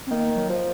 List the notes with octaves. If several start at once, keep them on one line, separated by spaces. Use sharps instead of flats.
C4
D#3 A#3
F#3
F3